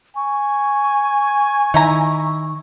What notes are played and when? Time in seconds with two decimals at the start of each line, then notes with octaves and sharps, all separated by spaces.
0.16 G#5 C#6
1.74 D#3 D#4 E4 A#5